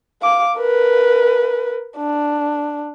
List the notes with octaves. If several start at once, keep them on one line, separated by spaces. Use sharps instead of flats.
F5 D6
A#4 B4
D4